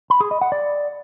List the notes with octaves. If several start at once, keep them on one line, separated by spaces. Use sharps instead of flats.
B5
G#4
D#5
F#5
D5